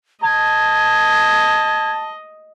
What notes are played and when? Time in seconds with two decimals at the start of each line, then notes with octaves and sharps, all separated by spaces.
0.24 D#5 A5 G#6